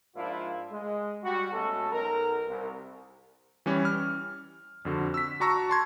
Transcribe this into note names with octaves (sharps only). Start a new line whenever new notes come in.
G#2 F3 A#3 D4 E4 F4
G#3
G3 F#4
B2 G#3 A3 C#4 A4
B1 A#4
C2
E3 G3 C#4
F6
F2 D3 F#4
E6 B6
F#4 A5 A#5 C#6 E6 A#6
A5 C6 G#6